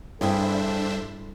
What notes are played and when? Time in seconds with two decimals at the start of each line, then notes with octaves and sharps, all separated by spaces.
0.21 G2 C4 D4 E4 G#4 A4 C5 E5